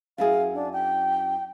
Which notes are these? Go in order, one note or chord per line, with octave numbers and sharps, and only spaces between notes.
F#2 E4 G#4 F5
D4
G5